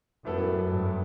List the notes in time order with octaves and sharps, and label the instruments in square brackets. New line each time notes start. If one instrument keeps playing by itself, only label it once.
[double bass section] F#2 [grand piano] A2 G3 B3 E4 A4
[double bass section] G2